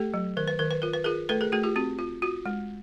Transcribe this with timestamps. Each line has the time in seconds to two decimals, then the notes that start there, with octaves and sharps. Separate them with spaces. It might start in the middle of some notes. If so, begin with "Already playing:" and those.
Already playing: A3 G4 A4
0.14 F#3
0.37 D#3 A#4
0.48 B4
0.59 D#3 A#4
0.71 B4
0.82 F4 A#4
0.94 B4
1.04 F4 G#4 A#4
1.29 A3 A4 B4
1.41 G#4 A#4
1.52 A3 F#4 G#4
1.63 F4 G4
1.76 C4 F#4
1.99 F4
2.22 F4 F#4
2.45 G#3